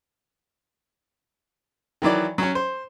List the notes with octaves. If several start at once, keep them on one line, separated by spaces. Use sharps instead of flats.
D#3 E3 F#3 D5
F#3 C#4
C5